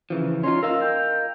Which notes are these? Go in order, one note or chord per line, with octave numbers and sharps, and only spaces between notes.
C#3 E3 F3
C#4 D#4 F4 C6
A#4 D#5 F5 E6
G5